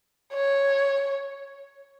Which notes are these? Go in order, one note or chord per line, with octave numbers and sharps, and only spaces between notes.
C#5